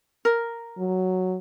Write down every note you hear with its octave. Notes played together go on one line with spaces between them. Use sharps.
A#4
F#3